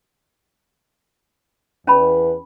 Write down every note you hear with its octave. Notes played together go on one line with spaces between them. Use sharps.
E2 C#4 B4 A5 B5